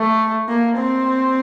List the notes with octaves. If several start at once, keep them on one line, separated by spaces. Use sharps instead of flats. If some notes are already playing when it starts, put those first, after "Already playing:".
Already playing: A3
A#3
C4